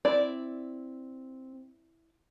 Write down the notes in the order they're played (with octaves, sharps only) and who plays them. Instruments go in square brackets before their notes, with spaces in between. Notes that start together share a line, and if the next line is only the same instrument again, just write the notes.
[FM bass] C4 [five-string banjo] E4 D5